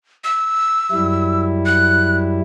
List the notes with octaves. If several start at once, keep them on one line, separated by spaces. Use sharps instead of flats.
E6
F#2 G3 E4
F#6